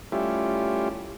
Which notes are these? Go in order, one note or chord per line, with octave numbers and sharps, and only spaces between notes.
G3 A3 C#4 E4 F4 G4